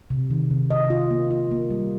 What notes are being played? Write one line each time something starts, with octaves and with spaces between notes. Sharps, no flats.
C3
D#3
C3
D#5
F4
A#3
F4
A#3
G3